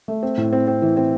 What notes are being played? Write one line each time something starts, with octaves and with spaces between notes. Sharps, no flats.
A3
C4
A2
C4
C4
E3
C4